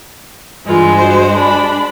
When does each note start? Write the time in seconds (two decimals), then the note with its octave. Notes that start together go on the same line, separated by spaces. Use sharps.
0.66 G2 E3 G#3 F4
0.97 F#4 C5
1.36 D4 B5